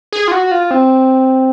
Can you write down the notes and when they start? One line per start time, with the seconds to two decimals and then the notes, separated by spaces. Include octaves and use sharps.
0.13 G#4
0.28 F4
0.32 F#4
0.51 F4
0.71 C4